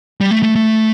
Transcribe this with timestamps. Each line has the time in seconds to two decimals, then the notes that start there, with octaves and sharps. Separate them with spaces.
0.21 G3
0.31 A3
0.43 A3
0.55 A3